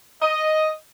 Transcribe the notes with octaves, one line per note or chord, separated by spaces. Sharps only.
D#5